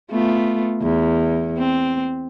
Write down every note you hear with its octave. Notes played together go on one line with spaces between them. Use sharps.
A3 B3 F4
E2
C4